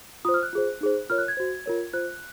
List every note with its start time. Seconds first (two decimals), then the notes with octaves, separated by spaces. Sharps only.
0.25 F4 C5 D#6
0.34 F6
0.43 F#6
0.53 F4 G#4 C5
0.81 D#4 G#4 C5
1.10 F4 A#4 C#5 F6
1.18 F#6
1.28 G#6
1.37 F#4 C5
1.66 F4 A#4 C#5
1.93 F4 C5 F#6